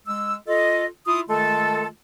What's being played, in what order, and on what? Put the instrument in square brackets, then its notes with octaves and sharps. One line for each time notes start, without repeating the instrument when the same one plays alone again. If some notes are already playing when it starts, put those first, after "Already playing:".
[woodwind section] G#3 E6
F4 A4 D#5
E4 F4 D#6
D#3 G#3 A3 F4 A4